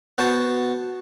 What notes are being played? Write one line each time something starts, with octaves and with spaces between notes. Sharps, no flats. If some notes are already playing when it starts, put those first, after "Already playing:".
B3 F#4 C5 A5